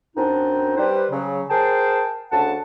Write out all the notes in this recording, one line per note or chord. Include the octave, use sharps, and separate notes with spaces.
F#2 C4 D4 D#4
G3 B4 C5
C#3 F#3
G#4 A#4 C5 G5 A5
D2 C#3 F#5 A5